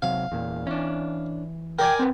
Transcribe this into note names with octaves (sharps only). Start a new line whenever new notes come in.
C3 F#3 F5
E2 A#2
E3 C#4 D4
A#4 D5 G5 G#5
C4 B4